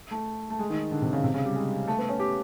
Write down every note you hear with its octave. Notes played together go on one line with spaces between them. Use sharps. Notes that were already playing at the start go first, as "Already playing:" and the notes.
A3
A3
G#3
D#3
D3
C3
C#3
C3
C#3
G3
G#3
A3
B3
C#4
G4